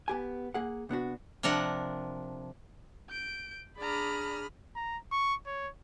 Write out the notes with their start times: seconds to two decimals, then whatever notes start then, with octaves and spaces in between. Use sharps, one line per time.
0.08 B3 G4 G#5
0.54 A#3 G#4 F#5
0.89 C3 B3 D4 F#4
1.43 C3 F3 D4 A#4 F#5
3.10 G6 D7
3.78 D4 G#4 D5 A#5 B5 D#6 F6
4.76 A#5
5.12 C#6
5.46 C#5